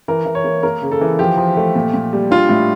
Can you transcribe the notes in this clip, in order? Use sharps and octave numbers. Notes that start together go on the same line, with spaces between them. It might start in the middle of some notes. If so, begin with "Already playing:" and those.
E3 A#4
E3
C#5
A#3
A#3 A#4
C#3
A4
E3
F3 G4
F3
A3
A#2
A#2
G3
D4 F4
A2